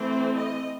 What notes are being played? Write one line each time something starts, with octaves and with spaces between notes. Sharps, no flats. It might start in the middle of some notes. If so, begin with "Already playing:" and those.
Already playing: E3 A3 C4 C5
D#5